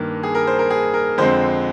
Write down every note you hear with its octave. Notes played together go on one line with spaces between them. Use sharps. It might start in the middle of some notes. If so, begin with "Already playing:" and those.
Already playing: G2 D#3 A#3
G#4
A#4
C5
A#4
G#4
A#4
F2 D3 G#3 C4 C5